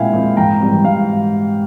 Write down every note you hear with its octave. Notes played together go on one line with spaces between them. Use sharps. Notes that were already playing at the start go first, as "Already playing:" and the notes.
Already playing: A#2 G#3 C4 E4 E5 F5 G5 G#5
G#3 C4 E4
G#2 G5 A#5
E3 G3 C4
G#2 F5